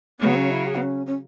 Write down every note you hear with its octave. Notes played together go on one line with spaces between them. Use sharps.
C#3 F#3 B3
C#4
E4
G#4
B3
C#4
C#4